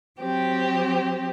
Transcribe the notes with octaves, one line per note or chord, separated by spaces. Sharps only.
F#3 C4 G4